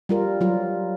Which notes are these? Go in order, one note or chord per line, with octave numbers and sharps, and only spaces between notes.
G3 F4 A#4
F#3 F4